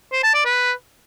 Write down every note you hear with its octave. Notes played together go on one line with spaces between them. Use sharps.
C5
A5
D5
B4